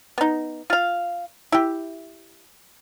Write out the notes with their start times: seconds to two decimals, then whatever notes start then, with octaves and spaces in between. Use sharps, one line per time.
0.18 B3 D#4
0.70 F4 F5
1.52 E4 G4